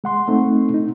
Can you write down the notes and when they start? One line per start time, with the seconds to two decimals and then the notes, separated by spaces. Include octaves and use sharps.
0.04 G#3 F#5 C6
0.28 A3 C4 D#4
0.74 D#4